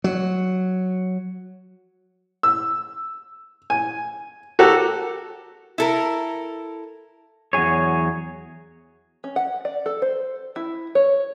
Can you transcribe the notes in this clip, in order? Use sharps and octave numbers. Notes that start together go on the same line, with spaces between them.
F#3
E6
G#5
F#4 G4 A4 A#4
E4 A4 A#4
E2 F#3 E4 G#4 C#5
C#4
F#5
D5
A4
C5
E4
C#5